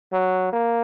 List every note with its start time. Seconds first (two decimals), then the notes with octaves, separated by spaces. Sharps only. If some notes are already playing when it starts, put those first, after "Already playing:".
0.13 F#3
0.53 A#3